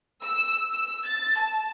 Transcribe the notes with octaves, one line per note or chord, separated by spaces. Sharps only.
E6
E6
A6
A5